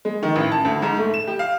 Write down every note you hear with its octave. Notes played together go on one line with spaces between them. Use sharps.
G#3
D#3
A1
A5
D2
G#2
A3
E7
G4
F5